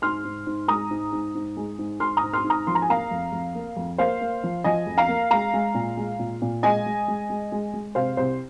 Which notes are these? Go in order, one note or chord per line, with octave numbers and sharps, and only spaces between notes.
G#2 C6 F6
G#2
G#2
G#3 A#5 D#6
G#2
G#2
G#2
G#3
G#2
G#2 C6 F6
A#5 D#6
G#2
C6 F6
G#2
A#5 D#6
F3 C6
A#5
G#5
A#3 F5 A#5
F2
F2
A#3
F2
A#3 C5 F5
A#3
F3
F3 D#5 G#5
F2
F5 A#5
A#3
G#3 F5 A#5
G#3
A#2
G#3
A#2
A#2
G#3 D#5 G#5
G#3
G#3
G#3
G#3
G#3
C3 C5 F5
C2 C5